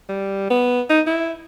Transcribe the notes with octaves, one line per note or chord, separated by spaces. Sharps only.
G3
B3
D#4
E4